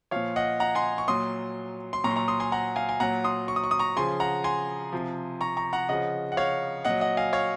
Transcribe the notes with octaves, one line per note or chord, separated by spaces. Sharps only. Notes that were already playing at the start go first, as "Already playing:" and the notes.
A#2 F3 C#5 F5
D#5 F#5
F#5 A#5
G#5 C6
C#6
A#2 F#3 C6 D#6
C6
A#2 F#3 A#5 C#6
C6
A#5 C#6
C6 D#6
G#5 C6
F#5 A#5
F5 G#5
G#5
A#2 F#3 F#5 A#5
C6 D#6
C#6
D#6
C#6
D#6
A#5 C#6
C#3 F3 G#5 C6
F#5 A#5
G#5 C6
C3 F3
A#5 C#6
A#5 C#6
F#5 A#5
C#3 F3 D#5 F#5
F#5
C#5 F5
A#2 F#3 D#5 F#5
D#5 F#5
F5 G#5
C#5 F5